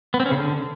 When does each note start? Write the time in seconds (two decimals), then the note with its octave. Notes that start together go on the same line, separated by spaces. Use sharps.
0.14 B3
0.20 C4
0.26 C#4
0.31 C#3
0.37 D3